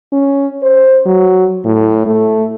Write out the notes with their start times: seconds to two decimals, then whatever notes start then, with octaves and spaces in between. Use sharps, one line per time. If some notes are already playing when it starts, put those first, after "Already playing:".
0.12 C#4
0.63 C5
1.06 F#3
1.65 A2
2.07 A3